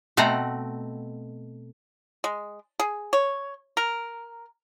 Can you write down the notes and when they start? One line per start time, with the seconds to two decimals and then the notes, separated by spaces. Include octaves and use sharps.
0.17 B2 A3 C4 F#5 A#5
2.24 G#3
2.79 G#4
3.13 C#5
3.77 A#4